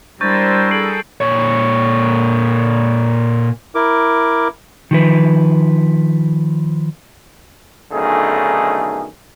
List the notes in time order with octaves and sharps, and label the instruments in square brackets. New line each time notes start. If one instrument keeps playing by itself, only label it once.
[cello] G3 A#4 [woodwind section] D4 E4 [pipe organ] C5 [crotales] C#6 G6 A6
[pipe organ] G#4 A4 [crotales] C7 D7 F#7
[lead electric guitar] A#2 C#5
[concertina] E4 A#4 D6
[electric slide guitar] D#3 F3 B4
[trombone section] B1 D3 D#3 A3 C#4 G#4